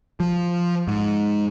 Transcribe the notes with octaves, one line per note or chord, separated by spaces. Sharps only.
F3
G#2